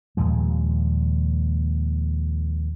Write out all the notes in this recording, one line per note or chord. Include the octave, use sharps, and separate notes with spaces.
D#2 A#2 F3 G#3